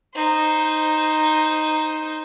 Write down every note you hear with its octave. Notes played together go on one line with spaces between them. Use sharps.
D#4 C5